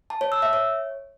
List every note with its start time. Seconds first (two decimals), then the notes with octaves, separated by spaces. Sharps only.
0.10 A5
0.21 C#5
0.32 E6
0.42 E5
0.53 C#5